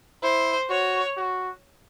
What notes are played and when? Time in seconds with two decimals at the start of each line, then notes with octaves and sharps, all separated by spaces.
0.23 E4 C5
0.69 F#4 C#5
1.17 F#4